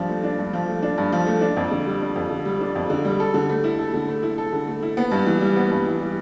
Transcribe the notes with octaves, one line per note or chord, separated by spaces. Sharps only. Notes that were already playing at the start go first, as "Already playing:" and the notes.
Already playing: G2 F3 D4
A3
D4
G2
F3
A3
D4
G2
F3
A3
D4
F2
D3
G3
D4
F2
D3
G3
D4
F2
D3
G3
A4
D3
A3
E4
A4
D3
A3
E4
A4
D3
A3
E4
B3
G2
E3
G3
B3
G2
E3
G3